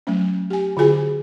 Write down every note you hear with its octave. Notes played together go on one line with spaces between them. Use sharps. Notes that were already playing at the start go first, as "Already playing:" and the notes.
F#3 A3 C#4
G4 G#5
D3 F4 F#4 G#4 G#5